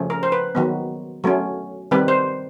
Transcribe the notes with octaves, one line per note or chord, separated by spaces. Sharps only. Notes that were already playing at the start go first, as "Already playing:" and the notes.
Already playing: C#3 F3 A3 C#4
A#4
C5
B4
D#3 F#3 B3
F#3 A3 C#4
D#3 G3 C4 B4
C5